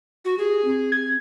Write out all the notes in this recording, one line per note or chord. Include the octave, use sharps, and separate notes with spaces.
F#4
G4 G#4
C4
G#6